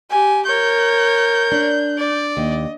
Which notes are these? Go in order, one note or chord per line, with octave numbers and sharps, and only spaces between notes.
G4 G#5
A#4 C#5 G6
D4
D5
D#2 D#5